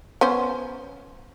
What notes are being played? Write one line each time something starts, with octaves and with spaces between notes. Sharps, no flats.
B3 C#4 C5